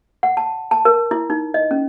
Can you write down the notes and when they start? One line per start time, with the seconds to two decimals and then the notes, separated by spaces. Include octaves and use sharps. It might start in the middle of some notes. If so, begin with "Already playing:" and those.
0.23 F#5
0.37 A5
0.71 A5
0.85 A#4
1.11 E4
1.30 D#4
1.54 D#5
1.71 C#4